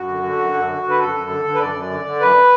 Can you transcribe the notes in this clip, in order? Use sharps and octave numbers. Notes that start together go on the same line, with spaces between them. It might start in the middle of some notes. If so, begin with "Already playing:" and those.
Already playing: F#2 F#4
D3
D3
F#2
F#2
D3
D3
B4
F#2 A4
F#2
D3
D3
B4
F#2 D5
F#2
D3
D3
F#2 B4